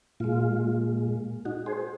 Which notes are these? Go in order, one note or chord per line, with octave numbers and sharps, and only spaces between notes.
A#2 G#3 F4
D#4 F#4
G#4 C5